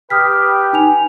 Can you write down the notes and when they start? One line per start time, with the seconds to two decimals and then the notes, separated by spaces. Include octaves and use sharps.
0.10 G4 B4 G5 D#6 F6 B6
0.73 D#4 G#5 F7